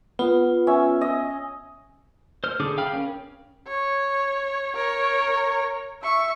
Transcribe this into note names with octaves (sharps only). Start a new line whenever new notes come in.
B3 F4
C#4 E5
D#5
C5 F6
D3 D4 G#4 D6
F5 G5 B5 F6
C#4 A#4
C#5
A#4 C#5
E5 C#6